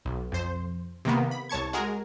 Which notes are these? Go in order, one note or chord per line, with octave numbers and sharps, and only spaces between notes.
B1
F2 C5
C3 D#3 A#3 B3
B5
C2 C#5 A5 C#6 G#6
G#3 F#4 G#4 A#4